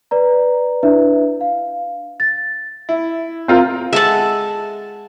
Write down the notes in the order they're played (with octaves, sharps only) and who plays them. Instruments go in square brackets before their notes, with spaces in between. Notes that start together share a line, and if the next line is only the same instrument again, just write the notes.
[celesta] B4 D5 A#5
D4 E4 B4 E5
F5
A6
[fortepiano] E4
[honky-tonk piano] C4 F4 A#4
[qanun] G#3 A4 F#5 [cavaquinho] E5 A5